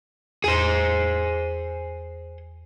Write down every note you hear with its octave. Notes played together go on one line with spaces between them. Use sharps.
E2 G#4 C5